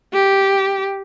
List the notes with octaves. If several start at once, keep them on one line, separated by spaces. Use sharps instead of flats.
G4